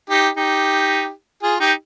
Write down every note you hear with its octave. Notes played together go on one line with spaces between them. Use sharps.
D#4 G4
D#4 G4
F4 G#4
D#4 G4